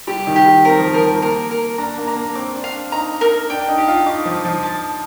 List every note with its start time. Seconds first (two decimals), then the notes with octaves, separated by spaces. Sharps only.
0.07 G3 G4
0.27 D#3
0.36 G4
0.46 G3
0.65 C4 A#4
0.79 F3
0.94 F3 A#4
1.07 F3
1.22 A#3 A#4
1.51 A#4
1.78 D4 A#5
1.98 A#3
2.08 A#5
2.17 A#3
2.35 C4 D6
2.55 D4
2.64 F5
2.92 D#4 A#5
3.21 A#4
3.50 D4 G5
3.69 D#4
3.78 G4
3.88 F4
4.06 D#4 D6
4.26 F3
4.35 D6
4.45 F3
4.63 A5